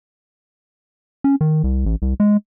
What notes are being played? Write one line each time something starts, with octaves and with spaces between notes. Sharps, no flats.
C#4
D#3
C2
A1
C2
G#3